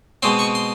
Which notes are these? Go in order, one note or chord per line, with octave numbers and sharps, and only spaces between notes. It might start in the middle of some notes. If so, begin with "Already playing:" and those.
B2 G#3 C4 C6
C#6
C6